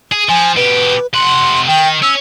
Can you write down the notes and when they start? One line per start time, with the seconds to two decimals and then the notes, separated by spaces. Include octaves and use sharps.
0.12 G#4
0.29 F3 G#5
0.57 B2 G4 B4
1.14 C3 F#5 C6
1.67 D#3 G5
2.02 C#4 E6